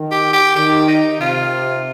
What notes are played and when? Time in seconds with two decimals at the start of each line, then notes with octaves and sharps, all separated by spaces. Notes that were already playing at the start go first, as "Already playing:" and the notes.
Already playing: D#3
0.12 G4
0.33 G4
0.55 D#3 G4
0.88 D#4
1.20 C3 F4